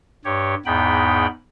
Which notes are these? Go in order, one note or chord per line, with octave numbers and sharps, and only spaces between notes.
G2 G4 C#5
E2 G#2 B3 D#4 G5 B5